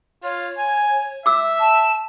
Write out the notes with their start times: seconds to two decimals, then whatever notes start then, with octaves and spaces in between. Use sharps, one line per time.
0.23 F4 C#5
0.58 G#5
1.26 E5 D6 E6
1.59 A5